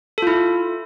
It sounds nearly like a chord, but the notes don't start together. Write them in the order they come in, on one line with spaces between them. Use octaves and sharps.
A4 F4 E4